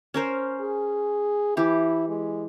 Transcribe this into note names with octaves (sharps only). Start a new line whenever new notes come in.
C#4 A#4 C5
G#4
E3 E4 G4
G#3